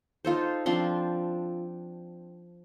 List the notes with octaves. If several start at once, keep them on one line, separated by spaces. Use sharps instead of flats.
D#4 F4 A4 C5
F3 C4 D4 C6